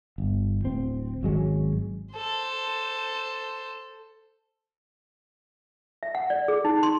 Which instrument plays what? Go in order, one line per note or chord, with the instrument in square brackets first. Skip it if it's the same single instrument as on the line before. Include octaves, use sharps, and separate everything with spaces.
[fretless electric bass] G1
D1 C4
G#1 F#3 G#3 C#4
[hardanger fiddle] A4 C5
[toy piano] E5
F#5
D5
G#4
D#4
C6